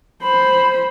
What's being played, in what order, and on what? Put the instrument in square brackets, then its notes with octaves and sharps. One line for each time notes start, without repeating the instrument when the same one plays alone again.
[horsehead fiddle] C5 B5